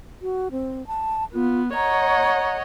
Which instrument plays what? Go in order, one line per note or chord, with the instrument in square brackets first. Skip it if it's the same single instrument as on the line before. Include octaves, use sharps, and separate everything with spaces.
[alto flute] F#4
C4
A5
[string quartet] B3 [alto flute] F4
[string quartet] C#5 D#5 F#5 [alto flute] A#5